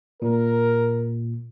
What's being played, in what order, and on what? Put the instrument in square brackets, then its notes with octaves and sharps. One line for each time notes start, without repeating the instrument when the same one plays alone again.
[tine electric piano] A#2 [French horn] A#4